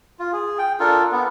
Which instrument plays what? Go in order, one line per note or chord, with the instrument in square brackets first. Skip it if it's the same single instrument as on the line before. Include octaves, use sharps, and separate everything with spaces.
[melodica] F4
G#4
G5
D4 F4 A4 A#4
B3